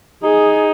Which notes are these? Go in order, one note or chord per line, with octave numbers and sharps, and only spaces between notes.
D#4 G#4